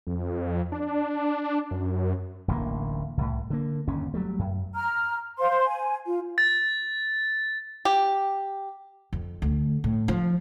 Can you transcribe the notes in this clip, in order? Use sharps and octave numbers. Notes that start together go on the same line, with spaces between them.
F2
D4
F#2
D1 A1 D3 A#3
C2 A2
D3 A#3
G1 D#2 C#4
F#3 G3 A3
F#2
A#5 F6
C5 F5 C6
G#5
F4
A6
G4
F2
D2
A2
F3